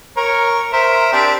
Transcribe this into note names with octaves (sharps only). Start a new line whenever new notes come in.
A#4 C#5
A#4 C5 E5
C4 D4 G4